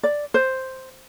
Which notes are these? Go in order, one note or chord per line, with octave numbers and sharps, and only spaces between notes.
D5
C5